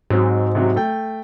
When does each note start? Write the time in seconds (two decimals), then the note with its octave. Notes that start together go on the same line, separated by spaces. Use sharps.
0.10 G#2 F#3 C4
0.55 C3 F#3
0.76 A3 G5